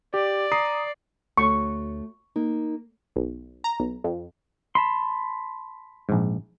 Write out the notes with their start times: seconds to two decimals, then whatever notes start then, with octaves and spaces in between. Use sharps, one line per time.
0.14 G4 D5
0.52 A#5 D#6 C7
1.38 D2 A3 F#4 C#5 C#6
2.36 A#3 D#4
3.16 B1
3.64 A#5
3.80 B1
4.04 F2
4.75 A5 B5 C6
6.09 A#1 G#2